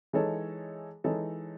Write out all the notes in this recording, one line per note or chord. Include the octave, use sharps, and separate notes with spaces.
E3 G#3 D#4 A4 C#5
E3 G#3 D#4 A4 C#5